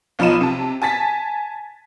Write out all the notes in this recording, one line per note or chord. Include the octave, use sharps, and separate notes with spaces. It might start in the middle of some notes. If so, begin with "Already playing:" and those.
B1 F3 D#4 B5 D#7 E7
C3 A5
G#5 A5 A6 B6